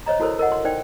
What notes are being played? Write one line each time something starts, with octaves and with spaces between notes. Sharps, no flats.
C5 C#5 D#5 A#5
E4 F#4 A4 A#4 C5 C#5
A#4 D#5 F#5
C6
D#4 C5 D5 G5